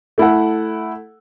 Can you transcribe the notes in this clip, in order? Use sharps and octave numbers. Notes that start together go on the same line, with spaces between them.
A3 E4 A4 F#5